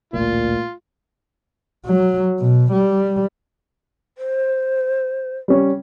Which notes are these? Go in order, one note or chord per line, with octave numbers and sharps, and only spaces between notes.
A1 D2 A#2 F4
F#3
B2
G3
C5
G3 C#4